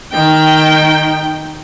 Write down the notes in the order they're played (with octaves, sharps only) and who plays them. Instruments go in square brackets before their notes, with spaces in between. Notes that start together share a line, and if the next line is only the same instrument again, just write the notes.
[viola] D#3 G5